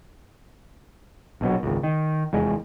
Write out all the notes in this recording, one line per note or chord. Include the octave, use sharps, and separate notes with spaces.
A#1 B2 F#3
G#1 C#2
D#3
F1 E2 G#3